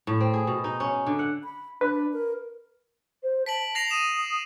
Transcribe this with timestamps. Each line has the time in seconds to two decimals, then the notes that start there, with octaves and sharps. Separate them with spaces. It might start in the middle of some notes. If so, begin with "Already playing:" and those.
0.07 A2
0.20 C4
0.34 G#4
0.47 B2
0.64 D#4
0.80 C#4
1.07 D3
1.19 F#5
1.44 B5
1.81 D4 B4
2.13 A#4
3.23 C5
3.46 A5 B6 D7 F#7
3.75 A#6 C7 F7
3.91 D#6 D#7 E7